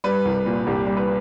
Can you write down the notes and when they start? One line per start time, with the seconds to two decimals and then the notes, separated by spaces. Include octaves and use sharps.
0.04 G3 B4
0.25 C2
0.46 A#2
0.67 C2 G4
0.87 G3
0.97 B4